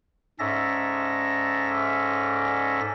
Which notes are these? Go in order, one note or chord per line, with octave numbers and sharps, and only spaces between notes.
G#2 C#4 A4 D5 E5 A#6